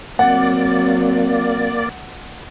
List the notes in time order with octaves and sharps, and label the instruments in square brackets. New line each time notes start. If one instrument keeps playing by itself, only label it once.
[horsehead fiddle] F#3 C4 [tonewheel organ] A#3 D5 [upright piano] F#5